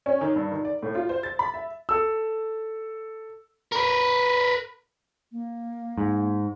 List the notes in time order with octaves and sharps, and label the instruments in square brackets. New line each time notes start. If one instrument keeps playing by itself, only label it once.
[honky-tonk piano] C#4
D#3
G2
D#3
D5
A2
F4
C5
A6
B5
E5
[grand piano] A4 E6
[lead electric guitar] A#4 B4
[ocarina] A#3
[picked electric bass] G#2